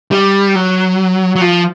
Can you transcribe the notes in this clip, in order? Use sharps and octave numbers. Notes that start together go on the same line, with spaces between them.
G3
F#3
F#3
F3